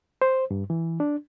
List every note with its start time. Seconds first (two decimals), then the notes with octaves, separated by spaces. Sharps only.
0.22 C5
0.51 G2
0.70 E3
1.00 D4